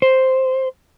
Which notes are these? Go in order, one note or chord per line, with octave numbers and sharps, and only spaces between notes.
C5